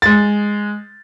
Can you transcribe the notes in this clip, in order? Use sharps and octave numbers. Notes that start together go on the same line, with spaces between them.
G#3 A6